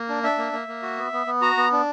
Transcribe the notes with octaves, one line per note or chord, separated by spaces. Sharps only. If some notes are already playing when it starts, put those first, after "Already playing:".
Already playing: A#3
D4
D4 E5
A#3
A#3
A#3
F#4
B3
B3
B3
F#4 A#5
B3
D4